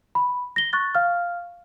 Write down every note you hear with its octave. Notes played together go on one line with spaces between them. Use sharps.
B5
A#6 G7
C#6 F#6 A6
F5 F6